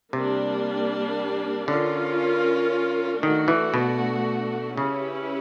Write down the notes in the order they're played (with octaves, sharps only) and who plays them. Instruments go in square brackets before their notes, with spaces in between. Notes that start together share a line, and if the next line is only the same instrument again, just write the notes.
[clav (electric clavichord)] C3 [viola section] G3 A#3 D4
[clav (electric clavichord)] D3 [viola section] C#4 F4 A#4
[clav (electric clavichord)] D#3 [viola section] A3 D4 F#4
[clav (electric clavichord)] E3
B2
[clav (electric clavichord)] C#3 [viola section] C#4 E4 G4 B4